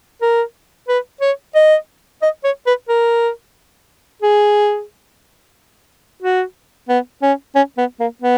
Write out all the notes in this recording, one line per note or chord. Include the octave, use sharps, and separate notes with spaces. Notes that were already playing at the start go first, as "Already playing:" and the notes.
A#4
B4
C#5
D#5
D#5
C#5
B4
A#4
G#4
F#4
B3
C#4
C#4
B3
A#3
B3